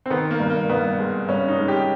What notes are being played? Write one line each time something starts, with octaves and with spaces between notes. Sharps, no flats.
C4
D#3 B3
A#3
G2
A#3
G2 B3
G#3
G2 C#4
D#4
G#3
G4